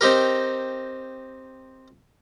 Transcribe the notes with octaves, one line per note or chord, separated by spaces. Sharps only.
C4 D#4 G4 A#4